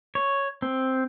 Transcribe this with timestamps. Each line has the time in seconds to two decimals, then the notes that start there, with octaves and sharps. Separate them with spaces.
0.15 C#5
0.62 C4